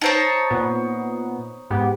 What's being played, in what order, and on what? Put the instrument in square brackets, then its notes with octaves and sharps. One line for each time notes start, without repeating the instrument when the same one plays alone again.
[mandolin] D#4 C5 C#5 [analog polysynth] A5
[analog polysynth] A#2 B3
G#2 B3 G4